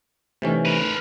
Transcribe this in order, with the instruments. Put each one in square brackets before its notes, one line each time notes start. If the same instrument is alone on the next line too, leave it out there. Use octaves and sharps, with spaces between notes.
[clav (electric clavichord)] C3 E3 C#4 [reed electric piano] A3 D#4
[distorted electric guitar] A#4 B4